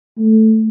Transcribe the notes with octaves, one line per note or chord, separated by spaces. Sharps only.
A3